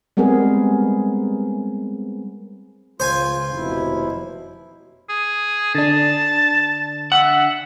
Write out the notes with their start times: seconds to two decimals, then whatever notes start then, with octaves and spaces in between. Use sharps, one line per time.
0.17 G3 G#3 B3 C4 G#4 A#4
3.00 C#2 F4 C5 G#5
3.53 F1 D#2 B2 E4
5.10 G#4
5.75 D3 D4 A5
7.12 E5 F#5